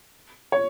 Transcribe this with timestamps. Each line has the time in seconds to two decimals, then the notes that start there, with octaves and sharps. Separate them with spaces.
0.52 C#5